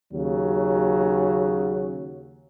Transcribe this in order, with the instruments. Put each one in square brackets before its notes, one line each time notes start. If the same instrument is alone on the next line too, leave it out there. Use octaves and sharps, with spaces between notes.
[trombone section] D#2 C#3 F#3